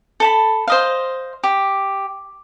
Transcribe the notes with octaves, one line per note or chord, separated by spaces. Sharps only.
A4 A5 B5
C5 D#5 F5
G4